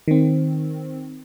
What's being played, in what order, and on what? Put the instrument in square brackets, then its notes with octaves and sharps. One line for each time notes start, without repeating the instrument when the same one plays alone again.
[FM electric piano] D#3 C4